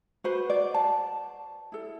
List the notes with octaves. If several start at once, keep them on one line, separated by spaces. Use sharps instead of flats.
F#4 B4 C5
D5
A5
E4 A4